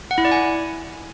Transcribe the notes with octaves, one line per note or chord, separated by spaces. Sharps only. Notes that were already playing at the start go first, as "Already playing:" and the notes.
F#5
E4
D5
G#5